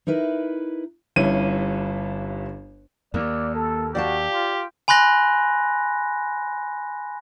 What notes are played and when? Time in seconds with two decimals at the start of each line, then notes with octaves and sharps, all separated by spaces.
0.07 D#4 E4 A#4 B4
1.16 G1 G2 C#4 E4 D#7
3.14 D#2 A#3 D5
3.55 A4
3.95 F#4 G4 D5 F5 A5
4.30 F4
4.88 G#5 B5 C6 F#6 A#6